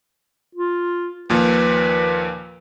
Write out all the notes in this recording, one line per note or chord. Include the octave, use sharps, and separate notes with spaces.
F4
D#2 A#2 F3 B4